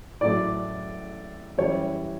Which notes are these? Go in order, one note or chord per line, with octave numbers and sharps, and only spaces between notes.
A1 A2 F#3 A3 D5
F#2 E3 G3 C#5